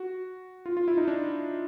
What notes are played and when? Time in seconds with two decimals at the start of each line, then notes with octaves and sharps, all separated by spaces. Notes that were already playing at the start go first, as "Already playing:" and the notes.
Already playing: F#4
0.66 F4
0.77 F4
0.88 E4
0.97 D#4
1.08 D4